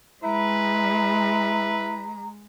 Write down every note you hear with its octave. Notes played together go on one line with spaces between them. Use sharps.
G#3 E4 B4 A#5